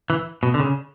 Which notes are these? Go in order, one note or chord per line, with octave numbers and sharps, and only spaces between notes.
E3
B2
D3
C#3